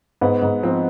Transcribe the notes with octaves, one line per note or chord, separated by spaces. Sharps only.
G#2 B3
G#2
F3 C4